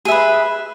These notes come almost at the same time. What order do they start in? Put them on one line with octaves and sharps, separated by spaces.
G#4 E5 B4